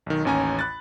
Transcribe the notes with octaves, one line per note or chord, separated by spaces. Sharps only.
B1 D#3
A1 D#2 C#4 G#5 A#5
B5 F#6 A6